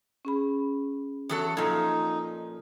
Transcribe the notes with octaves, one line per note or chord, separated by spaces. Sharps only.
C#4 G#4 B5
E2 F#3 A4
A#2 F3 D#4 A4